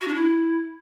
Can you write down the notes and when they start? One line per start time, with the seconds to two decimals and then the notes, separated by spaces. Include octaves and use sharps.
0.01 F#4
0.07 D4
0.14 E4